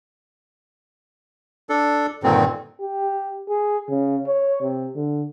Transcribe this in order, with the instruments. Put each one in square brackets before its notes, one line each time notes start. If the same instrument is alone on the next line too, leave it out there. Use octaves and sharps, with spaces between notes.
[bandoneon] D4 A4
G2 A#2 D3 D#3 C4
[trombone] G4
G#4
C#3
C#5
C3
D3